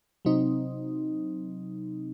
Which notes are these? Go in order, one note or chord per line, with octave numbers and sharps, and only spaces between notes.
C3 F#3 C4 D#4